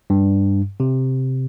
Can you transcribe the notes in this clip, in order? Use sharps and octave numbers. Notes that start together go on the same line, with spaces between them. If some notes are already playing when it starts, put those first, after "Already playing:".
G2
C3